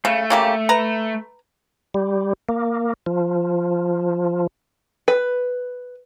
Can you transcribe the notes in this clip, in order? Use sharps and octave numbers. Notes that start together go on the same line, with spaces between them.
C#3 A3
C#3 A#3 G4
B4 A#5
G3
A#3
F3
B4